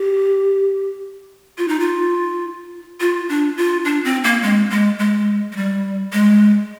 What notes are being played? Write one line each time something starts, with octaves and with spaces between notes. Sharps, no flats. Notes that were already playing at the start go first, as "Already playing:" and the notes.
Already playing: G4
F4
D#4
F4
F4
D4
F4
D4
C4
A#3
G#3
G#3
G#3
G#3
G3
G#3